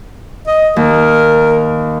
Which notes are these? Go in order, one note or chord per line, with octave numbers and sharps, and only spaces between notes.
D#5
D#2 A#4